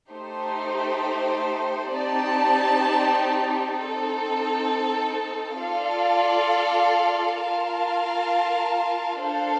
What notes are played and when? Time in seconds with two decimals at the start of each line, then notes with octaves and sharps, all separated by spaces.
0.10 A3 D#4 G4 C5
1.92 C4 D#4 G4 D5 A5
3.74 C4 D#4 A4
5.57 F4 A4 D5 F5
7.38 F4 A#4 F5 A5
9.22 D4 A4 C5 F5